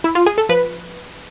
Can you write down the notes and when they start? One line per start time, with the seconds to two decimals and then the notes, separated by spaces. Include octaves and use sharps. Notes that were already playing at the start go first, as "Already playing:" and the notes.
0.04 E4
0.15 F4
0.26 G#4
0.38 A4
0.49 F3 B4